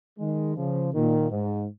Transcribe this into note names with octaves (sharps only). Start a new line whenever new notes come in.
D#3 G#3
C#3 F3
A#2 D#3
G#2